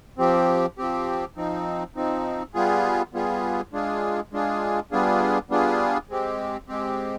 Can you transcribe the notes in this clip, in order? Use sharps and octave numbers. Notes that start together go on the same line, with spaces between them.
F3 C4 G4
F3 C4 G4
F3 C4 D#4
F3 C4 D#4
G3 B3 F4 G#4
G3 B3 F4 G#4
G#3 D4 F4 G#4
G#3 D4 F4 G#4
G3 B3 D4 F4 G#4
G3 B3 D4 F4 G#4
G#3 C4 G4
G#3 C4 G4